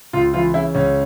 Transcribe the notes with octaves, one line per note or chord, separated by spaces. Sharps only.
C#2 F4
E3 F4
C#3 E4
C#2 C#4